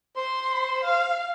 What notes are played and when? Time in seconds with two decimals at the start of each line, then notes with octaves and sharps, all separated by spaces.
0.16 C5 C6
0.84 F5